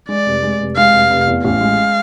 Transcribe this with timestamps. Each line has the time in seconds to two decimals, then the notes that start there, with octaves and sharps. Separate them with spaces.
0.08 G#3 D5
0.26 F1
0.43 G#3
0.60 F1
0.76 G#3 F5
0.93 F1
1.11 F1
1.27 E2
1.44 A1 F5
1.61 G#3